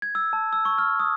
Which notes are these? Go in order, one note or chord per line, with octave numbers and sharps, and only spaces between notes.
G#6
E6
A5
E6
C#6
F6
D#6